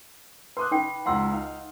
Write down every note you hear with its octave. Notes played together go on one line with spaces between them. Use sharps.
B4 C6 D6 D#6 F#6
D#4 B4 G5
C#2 F#5 A#5 C6 E6
D#4 F5